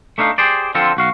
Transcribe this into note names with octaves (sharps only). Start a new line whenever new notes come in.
A3 D4 D#4 E5 F5
G4 G#4 C5 D5
D3 F3 C4 F4 A4
B1 F#4 F5